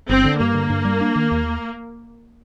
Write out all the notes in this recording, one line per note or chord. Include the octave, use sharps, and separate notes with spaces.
G1 C4
D3
G2 A#3
D3
G2
G3
D4
D#3
D#2